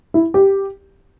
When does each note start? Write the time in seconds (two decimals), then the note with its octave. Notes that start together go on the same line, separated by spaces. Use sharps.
0.14 E4
0.34 G4